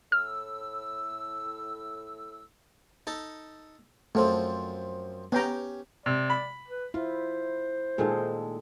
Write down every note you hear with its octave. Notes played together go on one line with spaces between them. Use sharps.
A2 E6 F6
D#4 A4 A5
F#2 F3 A3 C4 A4
B3 C#4 G4 G5 A#5
C3 D5
B5
B4
E4 F4 C5
A#2 D#3 G#3 G#4 A4